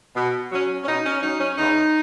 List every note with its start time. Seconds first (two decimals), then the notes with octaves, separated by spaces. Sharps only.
0.16 B2
0.51 F#3 C#4
0.83 C#4
0.87 B2 D#4
1.05 C#4
1.22 F#3 C#4 D#4
1.40 C#4
1.57 E2 D#4